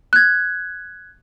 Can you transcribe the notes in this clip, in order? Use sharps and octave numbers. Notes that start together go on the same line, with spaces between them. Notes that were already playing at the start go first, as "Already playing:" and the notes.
F#6 G#6